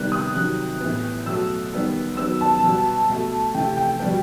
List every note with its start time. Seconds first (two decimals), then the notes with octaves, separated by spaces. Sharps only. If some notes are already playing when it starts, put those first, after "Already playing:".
Already playing: C3 D#3 G3 B3 F#6
0.12 D#6
0.35 C3 D#3 F#3 F#6
0.80 A2 E3 B3
1.26 B2 F#3 A3 E6
1.73 D#3 G3 B3
2.17 D#3 F#3 B3 E6
2.41 A5
2.63 B2 G3 B3
3.09 B2 A3
3.54 C3 E3 A3 G5
3.77 G5
4.00 B2 G3 B3